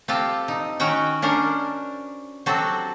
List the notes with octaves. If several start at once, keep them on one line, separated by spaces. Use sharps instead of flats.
C4 F4 G4 A4
D#4
D#3 C#4 F#4 G5
C#4 D4 A#4 C5
F#3 C4 F#4 G4 A4